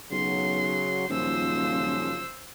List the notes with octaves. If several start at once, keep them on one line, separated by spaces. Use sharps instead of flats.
B1 C#3 F#3 C6
D#1 F#2 C#3 F3 C5 E6